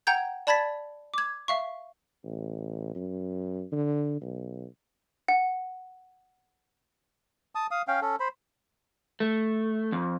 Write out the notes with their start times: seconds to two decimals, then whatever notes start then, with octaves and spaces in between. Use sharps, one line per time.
0.07 F#5 G5 A#5 G6 G#6
0.47 D5 A5 B5 G#6 A6 B6
1.14 D6 G#6
1.48 E5 F5 C#6
2.24 A1
2.95 F#2
3.72 D3
4.21 B1
5.28 F#5
7.55 A5 D#6
7.71 F5 D#6
7.88 C#4 F5 G5
8.02 C#4 A4
8.20 C5 B5
9.20 A3
9.92 F2